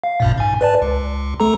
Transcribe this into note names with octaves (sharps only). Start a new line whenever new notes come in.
F5
A#1 F#2 A#2
G#2 G#5
B4 D5 A5
C#2
A3 A4 A#5